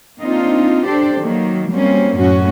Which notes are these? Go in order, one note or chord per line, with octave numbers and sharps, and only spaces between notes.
A#3 C4 D4 D#4 F4
D4 G4 A4 C5 D5
D#3 F#3 A#3
F#3 G3 A#3 C4 C#4
F#2 A2 C#4 F#4